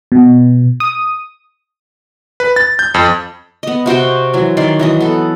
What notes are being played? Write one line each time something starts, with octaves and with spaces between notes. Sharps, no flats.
B2
D#6
B4
A6
G6
F2
B3 D#5
C3 F#4 C5 G5
E3 F#3
D#3 D5 C6
E3 F#3 D#5
B3 A4